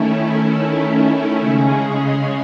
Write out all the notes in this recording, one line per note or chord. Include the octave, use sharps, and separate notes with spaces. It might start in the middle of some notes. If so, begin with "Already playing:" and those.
Already playing: D#3 A3 C#4 E4
C#3 G#3 C#4 G#4